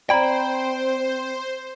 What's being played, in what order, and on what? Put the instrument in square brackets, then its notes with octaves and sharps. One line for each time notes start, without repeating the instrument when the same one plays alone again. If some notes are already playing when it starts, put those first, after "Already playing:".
[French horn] C4 [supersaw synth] C5 [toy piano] D5 A#5 [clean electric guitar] G5 B5